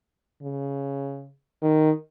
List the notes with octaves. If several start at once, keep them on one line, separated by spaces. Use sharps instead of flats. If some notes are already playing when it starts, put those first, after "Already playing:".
C#3
D#3